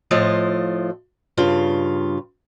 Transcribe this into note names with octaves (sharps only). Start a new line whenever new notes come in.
A2 F3 F4 D#5
G2 C#3 F4